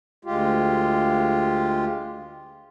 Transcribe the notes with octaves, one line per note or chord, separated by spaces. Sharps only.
D2 G#3 F4 G4